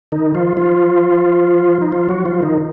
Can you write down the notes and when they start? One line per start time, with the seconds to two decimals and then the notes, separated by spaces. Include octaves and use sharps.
0.12 D#3 D#4
0.35 F3 F4
0.57 F3 F4
1.81 D#4
1.92 F3 F4
2.09 F#3 F#4
2.25 F3 F4
2.42 D#3 D#4